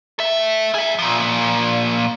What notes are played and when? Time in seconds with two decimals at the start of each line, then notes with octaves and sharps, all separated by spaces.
0.19 A4 E5
0.75 G#4 E5
0.99 A#2 F3